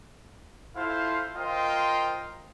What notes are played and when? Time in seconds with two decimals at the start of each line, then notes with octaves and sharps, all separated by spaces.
0.76 E4 F4 A4 C5 F5
1.36 F4 A#4 C5 D#5 F5 G5